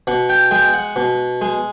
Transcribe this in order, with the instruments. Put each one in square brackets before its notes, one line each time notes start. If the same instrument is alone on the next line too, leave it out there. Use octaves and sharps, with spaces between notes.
[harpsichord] B2 F#5
G5
G#3 G5
F#5
B2
G#3